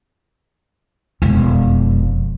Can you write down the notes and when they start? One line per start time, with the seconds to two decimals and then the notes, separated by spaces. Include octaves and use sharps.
1.22 E1 F2